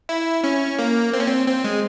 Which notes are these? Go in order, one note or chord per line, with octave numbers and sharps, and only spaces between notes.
E4
C#4
A#3
C4
C#4
C4
C4
G#3